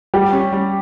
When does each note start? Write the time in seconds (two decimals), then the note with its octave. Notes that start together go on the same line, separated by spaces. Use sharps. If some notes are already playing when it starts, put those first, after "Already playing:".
0.14 G3 G4
0.33 C#4
0.52 G3